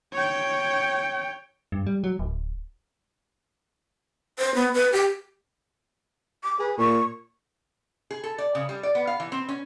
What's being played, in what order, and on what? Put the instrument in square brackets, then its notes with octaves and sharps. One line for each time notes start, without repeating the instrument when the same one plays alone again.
[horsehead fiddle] C#5 G5
[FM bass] G2
G3
F#3
D1
[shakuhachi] C5
B3
B4
G4
D6
[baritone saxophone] G#4 [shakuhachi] B4
[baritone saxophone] A#2 [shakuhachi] C#6
[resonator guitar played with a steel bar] G#4
A4
D5
C#3
G3
D5
B3
F5
E3
C4
C#4